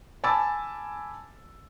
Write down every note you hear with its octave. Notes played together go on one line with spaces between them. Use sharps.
G#5 A5 B5 D6 E6 A6